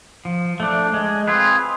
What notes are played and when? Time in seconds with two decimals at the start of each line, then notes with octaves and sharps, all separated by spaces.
0.25 F3
0.60 A3 D4
0.94 G#3
1.28 C4 F4 G#4 B4